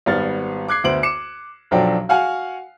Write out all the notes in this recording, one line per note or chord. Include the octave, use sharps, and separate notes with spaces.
G#1 G3 B3 F6 A6
D6 F#6 G#6 C7
D2 B3 C5 D7 F#7
D6 C#7 E7
B1 F3 F#3 D4 A4 G5
F#4 F5 F#5 G#5 F6